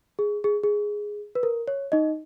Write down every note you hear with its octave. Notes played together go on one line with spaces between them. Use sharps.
G#4
G#4
G#4
B4
A#4
C#5
D#4 D#5